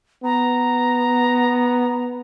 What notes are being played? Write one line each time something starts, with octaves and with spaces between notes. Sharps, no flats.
B3 A#5